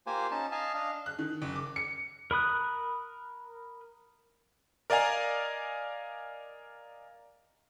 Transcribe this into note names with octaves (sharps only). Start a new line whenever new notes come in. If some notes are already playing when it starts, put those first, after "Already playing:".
A#3 F4 G4 C5 G#5
C#4 D#4 A5
D#5 F5 G#5 A5
D4 D#5 F5
F#6
D#3
F#1
D6
C#7
A#4 B5 D#6 F#6
A#4 D5 D#5 F5 G#5 A#5